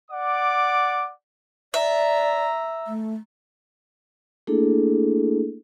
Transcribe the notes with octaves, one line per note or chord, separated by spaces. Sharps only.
D5 F#5 D6
D5 E5 A#5
A3
A3 A#3 D4 E4 G#4 A4